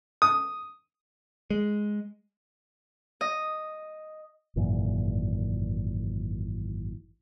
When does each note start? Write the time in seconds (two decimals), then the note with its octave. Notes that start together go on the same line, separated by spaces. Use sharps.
0.22 D#6
1.50 G#3
3.21 D#5
4.56 G#1 F#2 A#2 E3